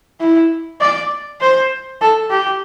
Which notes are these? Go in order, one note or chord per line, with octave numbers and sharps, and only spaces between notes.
E4
D5
C5
A4
G4